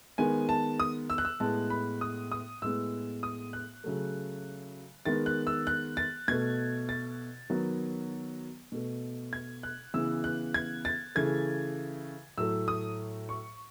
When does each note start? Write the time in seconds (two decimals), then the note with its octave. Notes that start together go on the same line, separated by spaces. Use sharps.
0.18 D#3 G#3 B3 G#5
0.49 A5
0.80 D#6
1.10 E6
1.18 F#6
1.25 E6
1.40 A2 G#3 B3 A5
1.70 B5
2.01 D#6
2.32 D#6
2.62 A2 G#3 B3 E6
3.23 D#6
3.53 F#6
3.84 C#3 F#3 A3
5.06 D#3 G#3 B3 A6
5.26 F#6
5.47 E6
5.67 F#6
5.97 A6
6.28 B2 A3 G#6
6.89 A6
7.50 D#3 F#3 B3
8.72 B2 A3
9.33 G#6
9.63 F#6
9.94 C#3 E3 B3 E6
10.24 F#6
10.54 G#6
10.85 A6
11.15 C#3 E3 A3 G#6
12.38 A2 F#3 A3 E6
12.68 D#6
13.29 C#6